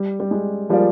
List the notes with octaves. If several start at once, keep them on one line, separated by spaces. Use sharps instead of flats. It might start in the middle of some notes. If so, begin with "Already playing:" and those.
Already playing: G3
G3
G#3
F3 G3 A#3 F4 G#4 D5